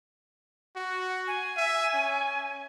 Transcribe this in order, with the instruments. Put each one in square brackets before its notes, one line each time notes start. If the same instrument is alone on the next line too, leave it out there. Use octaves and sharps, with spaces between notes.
[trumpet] F#4
[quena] G#5
[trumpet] E5
C#4